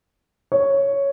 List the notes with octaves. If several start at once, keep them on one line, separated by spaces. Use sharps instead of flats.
C#5